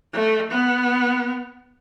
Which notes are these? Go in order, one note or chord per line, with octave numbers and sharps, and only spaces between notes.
A3
B3